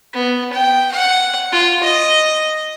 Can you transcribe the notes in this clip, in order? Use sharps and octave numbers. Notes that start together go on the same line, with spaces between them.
B3
G5
F#5
F4
D#5